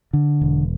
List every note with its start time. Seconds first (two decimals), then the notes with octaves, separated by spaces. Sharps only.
0.13 D3
0.41 E1